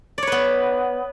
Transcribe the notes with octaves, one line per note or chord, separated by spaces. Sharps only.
B3 B4 C#5 D5